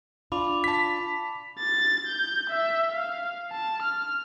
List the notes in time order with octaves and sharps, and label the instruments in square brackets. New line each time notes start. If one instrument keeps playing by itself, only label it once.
[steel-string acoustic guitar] D4 F4 [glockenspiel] B5 D6 F7
[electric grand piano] A5 B6
[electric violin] A6
G6
E5
F5
A5
F6